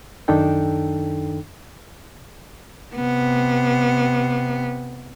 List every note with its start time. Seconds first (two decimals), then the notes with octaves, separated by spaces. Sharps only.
0.28 F#2 D#3 D4 D#4 A4 G5
2.96 C3 B3